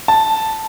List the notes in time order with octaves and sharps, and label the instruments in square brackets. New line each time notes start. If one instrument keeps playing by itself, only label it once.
[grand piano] A5